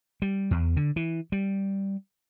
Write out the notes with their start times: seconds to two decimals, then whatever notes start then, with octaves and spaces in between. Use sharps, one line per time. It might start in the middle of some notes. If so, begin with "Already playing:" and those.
0.22 G3
0.51 E2
0.77 D3
0.96 E3
1.32 G3